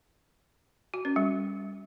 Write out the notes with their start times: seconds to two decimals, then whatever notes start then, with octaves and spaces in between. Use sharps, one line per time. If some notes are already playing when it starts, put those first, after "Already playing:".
0.94 F#4
1.05 C#4
1.16 G3